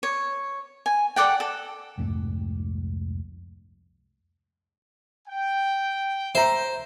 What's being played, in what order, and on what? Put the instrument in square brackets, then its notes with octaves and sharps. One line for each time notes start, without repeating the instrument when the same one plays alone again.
[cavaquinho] C#5
G#5
A4 D5 F#5 G5
A4
[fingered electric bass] C2 F2 G#2 A3
[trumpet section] G5
[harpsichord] C5 [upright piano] E5 A#5